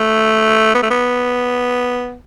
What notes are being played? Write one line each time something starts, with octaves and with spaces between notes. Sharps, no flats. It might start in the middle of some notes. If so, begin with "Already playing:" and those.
Already playing: A3
B3
A3
B3